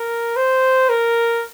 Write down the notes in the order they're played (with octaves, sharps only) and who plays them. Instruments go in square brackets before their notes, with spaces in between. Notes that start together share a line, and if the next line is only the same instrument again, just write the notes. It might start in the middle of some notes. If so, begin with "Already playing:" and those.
Already playing: [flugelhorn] A#4
C5
A#4